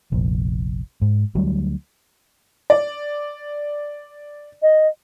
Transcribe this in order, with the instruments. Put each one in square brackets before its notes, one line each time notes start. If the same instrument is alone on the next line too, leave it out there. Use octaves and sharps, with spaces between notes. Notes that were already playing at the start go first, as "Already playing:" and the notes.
[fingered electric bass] F1 A#1
G#2
D2 F#3 G3
[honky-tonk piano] D5
[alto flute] D#5